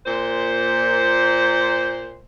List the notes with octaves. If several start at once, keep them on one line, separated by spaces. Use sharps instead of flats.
A#2 C5